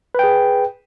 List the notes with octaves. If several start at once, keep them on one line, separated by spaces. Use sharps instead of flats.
G#4 B4 G5